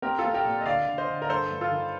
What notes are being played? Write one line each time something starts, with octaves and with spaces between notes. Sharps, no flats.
C4 G4 A#4
F4 A4
C4
G4 A#4
A#2
D#5
D3 D5 F5
D3
C5 D#5
D3
A#4
G2 A4 C5
G2
F4 A4
D#3